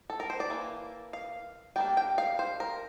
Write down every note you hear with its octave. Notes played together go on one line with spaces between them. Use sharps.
A4
A#4
C5
D5
E3 A#3
F5
G3 A#3 D4 G5
G5
F5
C5
A#4